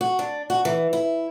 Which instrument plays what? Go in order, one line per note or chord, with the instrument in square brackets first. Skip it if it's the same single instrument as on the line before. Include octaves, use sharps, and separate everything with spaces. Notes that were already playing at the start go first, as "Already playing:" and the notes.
[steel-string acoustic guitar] F#4
D4
F#4
E3
E4